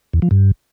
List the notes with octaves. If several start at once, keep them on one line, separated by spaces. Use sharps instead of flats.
E2
F3
G2